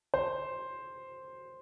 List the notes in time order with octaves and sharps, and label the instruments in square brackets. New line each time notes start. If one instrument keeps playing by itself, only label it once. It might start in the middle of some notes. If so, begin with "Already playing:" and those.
[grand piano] C5